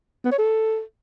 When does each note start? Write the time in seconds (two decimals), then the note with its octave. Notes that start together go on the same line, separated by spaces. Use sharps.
0.25 B3
0.32 C#5
0.38 A4